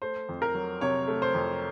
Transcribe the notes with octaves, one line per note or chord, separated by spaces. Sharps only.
A3 C5
F2
A#4
F#3
C3 C#5
A3
C5
F2